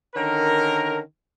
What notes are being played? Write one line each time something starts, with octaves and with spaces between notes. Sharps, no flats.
D3 D#3 C#4 A#4